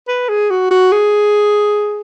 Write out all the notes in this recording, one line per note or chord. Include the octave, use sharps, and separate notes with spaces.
B4
G#4
F#4
F#4
G#4